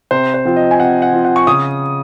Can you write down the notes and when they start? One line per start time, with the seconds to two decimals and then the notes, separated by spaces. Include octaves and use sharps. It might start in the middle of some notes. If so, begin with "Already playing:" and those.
0.11 C3 C5
0.34 C5
0.45 F3 C4 F4
0.57 D#5
0.71 G#5
0.80 C3 F#5
1.02 F#5
1.13 F3 C4 F4
1.25 F#5
1.36 C#6
1.47 C#3 D#6